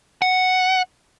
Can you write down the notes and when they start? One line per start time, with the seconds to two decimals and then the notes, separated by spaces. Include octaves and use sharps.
0.22 F#5